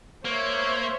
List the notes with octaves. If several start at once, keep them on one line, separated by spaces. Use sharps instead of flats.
A#3 C5 C#5 E5